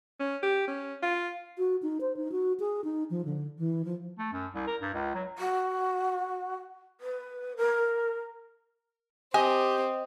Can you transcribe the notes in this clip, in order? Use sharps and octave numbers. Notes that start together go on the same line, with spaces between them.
C#4
G4
C#4
F4
F#4
D#4
C5
D#4
F#4
G#4
D#4
F3
D3
E3
F3
A3
F#2
C2
A#4
G2
C#2
F#3
F#4
B4
A#4
C4 G4 D#5 G#5